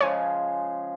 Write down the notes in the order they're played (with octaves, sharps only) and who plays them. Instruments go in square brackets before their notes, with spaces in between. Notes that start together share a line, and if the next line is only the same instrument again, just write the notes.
[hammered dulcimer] C#3 F3 G#3 [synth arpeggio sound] C#5 G#5